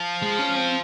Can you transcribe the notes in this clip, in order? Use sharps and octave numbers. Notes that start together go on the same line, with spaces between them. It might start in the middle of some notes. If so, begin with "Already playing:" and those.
Already playing: F3
G#3
C#4
C4